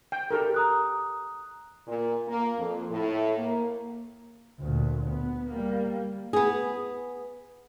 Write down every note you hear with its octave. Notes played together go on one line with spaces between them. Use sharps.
G5
G4 A4 A#4
A#5 D#6 F#6
A#2
A#3
F2
A2
A#3
D2 A#2
B3
G3 A#3
B3 G#4